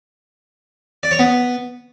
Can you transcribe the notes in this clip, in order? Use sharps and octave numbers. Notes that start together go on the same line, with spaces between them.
D5
C#5
B3